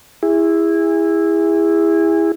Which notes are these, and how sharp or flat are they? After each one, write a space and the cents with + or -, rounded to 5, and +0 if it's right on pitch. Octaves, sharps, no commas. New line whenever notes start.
E4 +0 G#4 -25